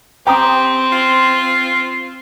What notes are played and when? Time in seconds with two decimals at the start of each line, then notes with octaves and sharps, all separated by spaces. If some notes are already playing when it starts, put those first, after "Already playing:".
0.27 C4 G4 G5 A#5 D#6
0.92 F4